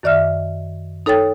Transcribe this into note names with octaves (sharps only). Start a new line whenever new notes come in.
F#2 D#3 D5 E5 F6
D#4 A4 C#5 G5 A6